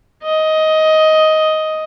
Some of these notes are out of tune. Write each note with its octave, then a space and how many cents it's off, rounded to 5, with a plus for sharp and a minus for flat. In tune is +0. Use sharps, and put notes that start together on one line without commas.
D#5 +10